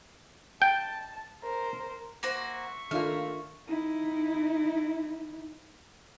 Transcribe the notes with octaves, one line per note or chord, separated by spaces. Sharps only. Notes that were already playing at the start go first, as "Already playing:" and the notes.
G5 A5
A#4 C5
A#3 F#4 C5 E5 C#6
D#3 A3 A#3 D4 F4 F6
D#4 E4